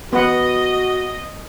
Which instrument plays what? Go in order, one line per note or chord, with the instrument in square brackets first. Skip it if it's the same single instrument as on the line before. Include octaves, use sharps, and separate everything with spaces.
[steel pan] B3 B4 F#5 [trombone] F#4 [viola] D#5